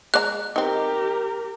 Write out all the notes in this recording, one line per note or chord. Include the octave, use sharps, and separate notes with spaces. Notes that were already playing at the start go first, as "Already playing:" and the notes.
G#3 D5 A#5 F#6
C4 D#4 G4 A#4